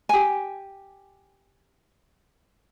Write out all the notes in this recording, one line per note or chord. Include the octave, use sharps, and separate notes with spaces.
G4 G#5